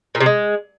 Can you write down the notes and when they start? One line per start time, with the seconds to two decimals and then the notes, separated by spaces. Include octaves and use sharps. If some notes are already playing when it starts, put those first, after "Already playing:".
0.15 A#2
0.20 C3
0.26 G#3